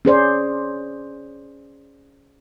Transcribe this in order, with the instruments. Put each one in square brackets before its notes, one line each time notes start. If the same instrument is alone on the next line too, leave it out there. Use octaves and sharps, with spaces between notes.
[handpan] C#4 G#4 C5 D5